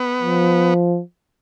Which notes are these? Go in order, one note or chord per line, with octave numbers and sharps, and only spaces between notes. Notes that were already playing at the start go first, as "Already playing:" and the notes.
Already playing: B3
F3